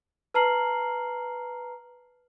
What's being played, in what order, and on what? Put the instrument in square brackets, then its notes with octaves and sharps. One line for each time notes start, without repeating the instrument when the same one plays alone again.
[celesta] B4 A5 A#5 F6 C7 F#7